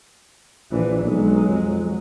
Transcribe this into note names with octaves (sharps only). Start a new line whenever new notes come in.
A#1 E3 D4
B1 F#3 G#3
F2